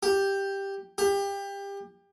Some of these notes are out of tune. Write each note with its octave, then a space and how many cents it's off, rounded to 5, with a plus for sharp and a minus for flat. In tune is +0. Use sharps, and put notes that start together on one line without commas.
G4 +5
G4 +25